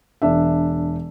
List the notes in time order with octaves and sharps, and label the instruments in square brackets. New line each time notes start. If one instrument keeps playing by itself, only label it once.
[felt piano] E1 D4 E5